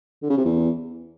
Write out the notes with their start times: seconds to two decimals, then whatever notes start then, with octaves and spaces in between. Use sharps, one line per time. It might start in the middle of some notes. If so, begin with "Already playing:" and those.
0.23 D3
0.30 C#3
0.37 C3
0.45 E2